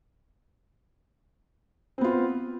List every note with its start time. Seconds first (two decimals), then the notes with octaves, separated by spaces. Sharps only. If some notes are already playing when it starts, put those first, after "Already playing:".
1.98 C4
2.01 B3
2.04 F4